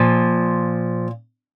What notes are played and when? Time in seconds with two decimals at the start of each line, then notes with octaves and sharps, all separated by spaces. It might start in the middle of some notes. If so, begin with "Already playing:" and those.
Already playing: A#2 F3